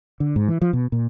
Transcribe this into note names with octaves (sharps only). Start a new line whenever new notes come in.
D3
G#2
E3
F3
B2
A#2